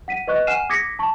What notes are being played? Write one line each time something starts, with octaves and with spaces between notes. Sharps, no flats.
F#5 B6 D#7
B4 D#5 C#6 F#6
F#5 G#5 F6 C7 D#7 E7
D6 D#6 G#6 A#6 B6 C#7
A5 C#6